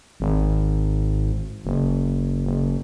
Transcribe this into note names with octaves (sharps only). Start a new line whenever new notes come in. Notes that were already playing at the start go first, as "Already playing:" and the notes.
G#1
F#1
F#1